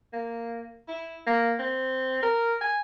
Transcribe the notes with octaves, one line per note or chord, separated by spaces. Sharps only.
A#3
E4
A#3
C4
A#4
G#5